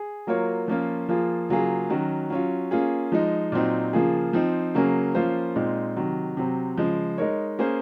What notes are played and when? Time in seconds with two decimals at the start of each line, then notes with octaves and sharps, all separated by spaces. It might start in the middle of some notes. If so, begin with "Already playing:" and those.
Already playing: G#4
0.27 F#3 A#3 F4 A#4 C#5
0.68 F3 A#3 C#4 F4
1.09 F3 A#3 F4 G#4
1.49 C#3 F#3 A#3 F4 G#4
1.90 D#3 F#3 C#4 F#4
2.30 F#3 C#4 F4
2.71 A#3 C#4 F4 G#4
3.12 F3 G#3 D#4
3.52 A#2 F#3 C4 D#4
3.93 C#3 F3 A#3 F4 G#4
4.33 F3 C4 D#4
4.74 C#3 F#3 A#3 C#4 G#4
5.15 F3 A#3 C#4 F4 C5
5.56 A#2 G#3 C4 D#4
5.96 C3 D#3 F#3
6.37 C3 F#3 C4
6.77 C#3 F3 G#3
7.18 G#3 D#4 A#4 C#5
7.59 A#3 C#4 G#4 C5